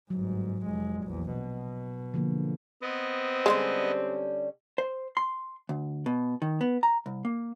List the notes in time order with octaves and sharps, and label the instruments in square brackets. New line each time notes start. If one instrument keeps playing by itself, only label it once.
[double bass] G1 G#2 [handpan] F#3
[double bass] F1 G#3
A#1 E2
B2
[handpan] D3 F3 A#3
[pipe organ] B3 D#5 [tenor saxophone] C4
[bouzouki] D3 G3 C#4 [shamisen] G#3
[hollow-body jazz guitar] C5
C6
D2
B2
D#3
B3
A#5
C2
A#3